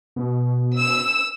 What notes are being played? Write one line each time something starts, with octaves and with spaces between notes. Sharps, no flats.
B2
E6